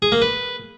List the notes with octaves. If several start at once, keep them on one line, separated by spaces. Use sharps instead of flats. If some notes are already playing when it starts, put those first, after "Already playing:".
G#4
A#3
B4